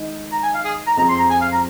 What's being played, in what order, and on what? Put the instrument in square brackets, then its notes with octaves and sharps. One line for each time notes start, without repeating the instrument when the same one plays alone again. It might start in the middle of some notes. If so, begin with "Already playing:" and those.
Already playing: [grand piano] D#3 G#3 D#4
[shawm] A#5
G#5
F5
G#4
A#5
[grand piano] F2 F3 C4 G#4 C5 [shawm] A#5
[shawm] C6
A#5
G#5
F5
A#5